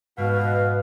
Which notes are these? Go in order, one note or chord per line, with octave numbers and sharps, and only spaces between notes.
G#2 B2 B4 F5